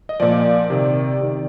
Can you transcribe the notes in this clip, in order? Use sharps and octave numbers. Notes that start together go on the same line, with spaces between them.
D#5
A#2 F3 D5
C3 D#3
C3 D#3